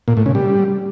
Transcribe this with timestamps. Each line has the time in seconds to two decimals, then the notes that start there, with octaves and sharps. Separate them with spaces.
0.08 A#2
0.17 A2
0.26 C#3
0.35 G3